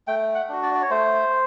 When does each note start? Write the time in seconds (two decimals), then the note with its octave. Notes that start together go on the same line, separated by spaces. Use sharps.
0.07 A3 G5
0.35 F#5
0.49 D4 F#4
0.63 D5
0.75 D5
0.82 C#5
0.90 A3 C5